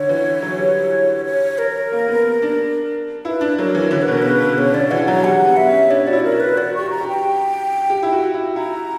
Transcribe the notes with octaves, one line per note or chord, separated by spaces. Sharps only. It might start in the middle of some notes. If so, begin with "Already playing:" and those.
Already playing: D3 C#5
E3
F#3
G3
C#5
A#4
A#3
B3
D4
E4 B4
D4
F#3 A#4
E3
D3 C#5
B4
B2 A#4
C#3 B4
B2
C#3 C#5
D3 D5
E3 F#5
F#3 A#5
G3 F#5
B3
E5
C#4
D4 C#5
F#4 D5
E4
A#4
F#4
B4
F#4 D5
G4 C#6
A#5
G4
G5
G4
E4
F#4
E4
E4 A#5